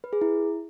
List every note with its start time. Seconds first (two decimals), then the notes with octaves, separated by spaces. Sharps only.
0.04 B4
0.13 G#4
0.21 E4